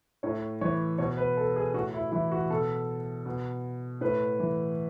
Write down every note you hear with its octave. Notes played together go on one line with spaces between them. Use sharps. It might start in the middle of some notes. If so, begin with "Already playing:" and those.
A2 C#5
E3 C#5
B2 C#5
B4
A4
G#4
A2 F#4
E4
E3 E4
F#4
B2 A4
B2
A2 B4
E3